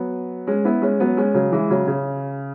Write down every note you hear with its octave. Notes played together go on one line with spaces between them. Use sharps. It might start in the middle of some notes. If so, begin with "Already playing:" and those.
Already playing: F#3 B3
G#3 C#4
B3 E4
G#3 C#4
F#3 B3
G#3 C#4
C#3 F#3
E3 G#3
C#3 F#3
C#3